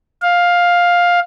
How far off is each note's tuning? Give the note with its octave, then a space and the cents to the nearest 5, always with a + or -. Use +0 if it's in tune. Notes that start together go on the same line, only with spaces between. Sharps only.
F5 +10